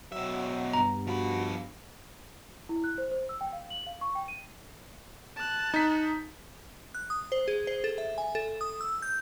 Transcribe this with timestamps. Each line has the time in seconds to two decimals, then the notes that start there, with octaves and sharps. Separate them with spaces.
0.12 B2 F#3 E5
0.73 G2 B3 A#5
1.07 F3 F#4 B5
2.69 E4
2.84 F#6
2.98 C5
3.11 C5
3.29 E6
3.41 G5
3.53 F5
3.70 F#7
3.87 F5
4.01 C#6
4.15 G5
4.28 D#7
5.36 A5 F#6
5.74 D#4 B6
6.95 F#6
7.10 D#6
7.32 C5
7.48 G#4
7.67 C5
7.84 A4
7.98 E5
8.18 G#5
8.35 A4
8.61 D#6
8.81 E6
9.02 G6